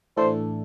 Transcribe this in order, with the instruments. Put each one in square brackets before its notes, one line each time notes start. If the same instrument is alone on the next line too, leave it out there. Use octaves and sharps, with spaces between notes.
[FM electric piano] A2 E3 A3 D4 A4 [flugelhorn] C5